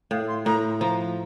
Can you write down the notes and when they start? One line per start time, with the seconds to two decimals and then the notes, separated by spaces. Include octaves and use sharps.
0.11 A2 F5
0.28 C6
0.46 A2 A#5
0.80 F3 A#5